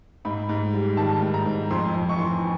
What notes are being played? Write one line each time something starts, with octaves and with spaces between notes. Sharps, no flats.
G#2 B5
G#2
G3
D#3 A5
G#2
A#5
G#2
F2 C6
F2
C#6
E3 C6